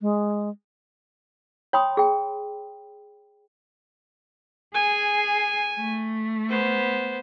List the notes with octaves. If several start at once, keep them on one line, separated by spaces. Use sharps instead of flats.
G#3
C#5 G5 B5 C6 D#6
G#4 G5
G#4 G#5
A3
B3 C5